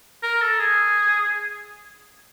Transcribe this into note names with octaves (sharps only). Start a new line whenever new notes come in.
A#4
A4
G#4